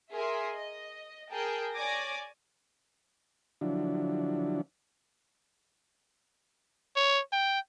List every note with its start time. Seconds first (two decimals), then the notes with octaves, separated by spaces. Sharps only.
0.12 G#4 A#4 E5 C6
0.57 D#5
1.32 G#4 A#4 G5 A5
1.74 C#5 D5 G#5 D6 G#6 A#6
3.61 D3 F3 F#3 D4 E4
6.96 C#5
7.33 G5